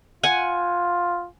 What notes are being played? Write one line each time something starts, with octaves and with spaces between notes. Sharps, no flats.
F4 F#5 G#5